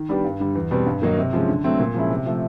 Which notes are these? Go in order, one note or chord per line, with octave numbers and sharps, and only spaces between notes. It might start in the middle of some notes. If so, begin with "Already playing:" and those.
Already playing: D#3
G3 B3 D4 G4
G2
D3 G3
E2
B2 G3 C4
G2
D#3 F#3 A#3 D#4
C3
F3 G#3 C#4
D3
F#3 A3 C4
A#2
F3 G#3 C#4 E4
C3
F3 A3